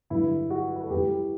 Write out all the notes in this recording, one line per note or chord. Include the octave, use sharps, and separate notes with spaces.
G2 D3 F#3 E4
F#4
B4
A4
F#2 E3 G3 G4